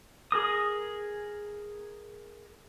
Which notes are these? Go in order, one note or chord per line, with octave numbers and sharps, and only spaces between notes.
G#4 A#4 D#6